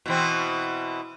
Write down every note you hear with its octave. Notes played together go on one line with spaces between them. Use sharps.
B2 E3 C4